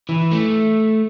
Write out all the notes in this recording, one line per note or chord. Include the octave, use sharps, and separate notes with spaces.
E3
A3